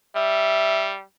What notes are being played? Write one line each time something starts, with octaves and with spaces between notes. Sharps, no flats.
G3 E5